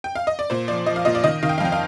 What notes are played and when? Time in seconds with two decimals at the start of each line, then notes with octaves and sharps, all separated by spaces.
0.04 G5
0.15 F5
0.27 D#5
0.39 D5
0.50 A#2 C5
0.68 F3 D5
0.86 F3 D#5
0.96 F5
1.05 A#2 D#5
1.15 D5
1.23 D#3 D#5
1.43 D#3 F5
1.49 G5
1.58 F5
1.60 F2 G5
1.72 F5